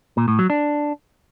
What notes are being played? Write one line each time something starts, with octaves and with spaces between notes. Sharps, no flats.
A#2
A2
F#3
D4